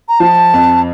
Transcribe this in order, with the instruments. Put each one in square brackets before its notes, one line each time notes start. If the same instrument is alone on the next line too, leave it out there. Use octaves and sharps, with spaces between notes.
[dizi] A#5
[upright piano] F3 [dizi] A5
[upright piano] F2